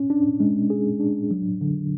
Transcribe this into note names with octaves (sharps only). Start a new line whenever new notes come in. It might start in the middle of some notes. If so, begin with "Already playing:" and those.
Already playing: C#4
D4
G#3
G#4
D4
F#3
D3